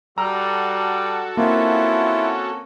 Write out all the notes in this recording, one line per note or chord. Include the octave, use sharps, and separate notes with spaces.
G3 F#4 A4 A#5 E6 F6
A#3 C4 C#4 E4 F4